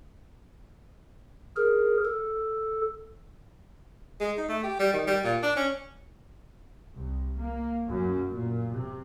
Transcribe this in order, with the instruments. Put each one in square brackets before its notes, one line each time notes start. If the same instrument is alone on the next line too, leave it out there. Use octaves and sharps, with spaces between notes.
[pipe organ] G#4 A#4
A4
[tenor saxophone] G#3
D#4
A3
G4
G3
D#3
G3
A#2
D4
C#4
[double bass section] C2
A#3
F#2
A#2
C3